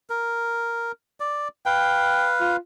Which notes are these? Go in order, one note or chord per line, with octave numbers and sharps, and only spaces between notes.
A#4
D5
B4 F5 G5
F4